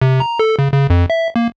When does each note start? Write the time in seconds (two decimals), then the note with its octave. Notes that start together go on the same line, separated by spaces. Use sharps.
0.02 C3
0.20 A#5
0.39 A4
0.59 C#3
0.72 C#3
0.90 F2
1.10 E5
1.36 A#3